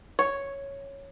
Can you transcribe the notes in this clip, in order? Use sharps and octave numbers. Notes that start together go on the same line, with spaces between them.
C#5